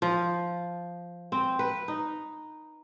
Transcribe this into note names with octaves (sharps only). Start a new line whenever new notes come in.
F3
C4
B4
D#4